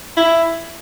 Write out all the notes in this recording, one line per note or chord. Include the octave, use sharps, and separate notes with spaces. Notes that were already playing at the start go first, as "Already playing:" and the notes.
E4